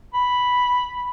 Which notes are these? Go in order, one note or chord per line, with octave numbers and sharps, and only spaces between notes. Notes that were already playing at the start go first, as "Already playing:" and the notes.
B5